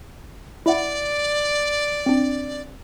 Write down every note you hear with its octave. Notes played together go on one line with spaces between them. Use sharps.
E4 D5 E5 F#5
C4 D4